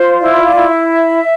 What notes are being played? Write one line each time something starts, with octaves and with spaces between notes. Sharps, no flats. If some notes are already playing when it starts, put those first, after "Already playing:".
Already playing: F4 C5
E4 D5 F5
D5 F5
E4
E5